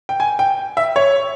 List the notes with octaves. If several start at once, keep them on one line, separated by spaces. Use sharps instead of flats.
G5
G#5
G5
E5
C#5